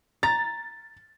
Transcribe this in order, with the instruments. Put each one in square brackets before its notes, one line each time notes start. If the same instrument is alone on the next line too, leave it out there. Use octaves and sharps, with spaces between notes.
[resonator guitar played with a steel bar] A#5 [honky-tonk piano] A6